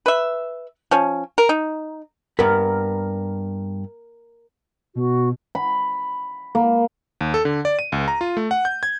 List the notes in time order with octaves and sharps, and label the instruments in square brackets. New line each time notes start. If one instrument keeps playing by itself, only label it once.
[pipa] B4 E5
F3 C#4
A#4
D#4
[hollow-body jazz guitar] G2 B3 B5 [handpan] A#4
[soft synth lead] B2 [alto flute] F#4
[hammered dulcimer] B5
A#3
[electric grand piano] D#2
A4
D3
D5
D#7
C#2
A#5
F4
A3
F#5
G6
G#6